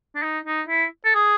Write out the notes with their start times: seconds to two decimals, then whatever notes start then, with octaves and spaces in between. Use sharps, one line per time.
0.15 D4
0.23 D#4
0.46 D#4
0.68 E4
1.05 A4
1.15 G#4